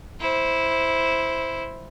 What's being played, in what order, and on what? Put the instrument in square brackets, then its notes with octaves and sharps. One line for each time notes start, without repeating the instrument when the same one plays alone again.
[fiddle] E4 C5